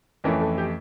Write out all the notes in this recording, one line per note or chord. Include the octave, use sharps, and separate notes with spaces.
F2 E3 A3 C#4 A#4
A4
G4